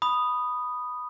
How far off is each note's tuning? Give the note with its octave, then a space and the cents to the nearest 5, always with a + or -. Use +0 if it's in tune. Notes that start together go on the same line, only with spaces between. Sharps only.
B5 +0 D#6 -10